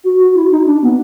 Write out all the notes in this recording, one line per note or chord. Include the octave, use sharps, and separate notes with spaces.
F#4
F#4
E4
D#4
D4
B3